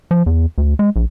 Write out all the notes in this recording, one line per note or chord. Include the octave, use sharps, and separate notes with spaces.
F3
E2
D2
G#3
A#1